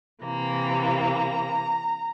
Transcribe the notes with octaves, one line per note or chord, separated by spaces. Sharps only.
C3 E3 A#3 A#5